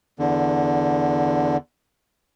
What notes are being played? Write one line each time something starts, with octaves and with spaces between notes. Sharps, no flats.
E2 D3